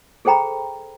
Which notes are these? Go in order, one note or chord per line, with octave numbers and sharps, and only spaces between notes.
G#4 A4 C5 G5 A#5 B5